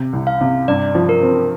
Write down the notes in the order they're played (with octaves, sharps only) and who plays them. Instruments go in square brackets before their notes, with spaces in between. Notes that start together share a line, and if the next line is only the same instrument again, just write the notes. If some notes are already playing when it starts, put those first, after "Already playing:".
Already playing: [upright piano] C3
C2
[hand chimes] F5
[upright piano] C3
[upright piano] G2 [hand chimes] D5
[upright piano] F3
[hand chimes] A#4
[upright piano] C4